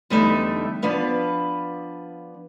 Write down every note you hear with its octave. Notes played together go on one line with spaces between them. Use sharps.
E2 D3 G3 A3 D#4 E5
F3 B3 D4 B4 F5